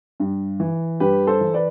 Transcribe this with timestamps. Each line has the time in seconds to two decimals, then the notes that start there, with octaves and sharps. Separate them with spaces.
0.20 G2
0.60 E3
1.00 G2 G4 B4
1.27 A4 C5
1.41 E3
1.54 B4 D5